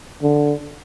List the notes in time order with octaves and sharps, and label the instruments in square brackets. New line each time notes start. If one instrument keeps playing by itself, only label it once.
[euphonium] D3